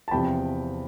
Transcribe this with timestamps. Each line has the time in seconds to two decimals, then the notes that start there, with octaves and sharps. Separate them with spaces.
0.08 A5
0.11 E2 C3 F3 C4 G5 B5